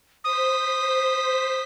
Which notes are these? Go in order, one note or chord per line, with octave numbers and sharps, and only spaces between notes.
C5 D#6 B6